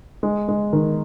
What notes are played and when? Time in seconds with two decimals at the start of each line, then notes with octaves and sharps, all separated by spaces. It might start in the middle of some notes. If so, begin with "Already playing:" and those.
0.23 G#3
0.48 G#3
0.73 D#3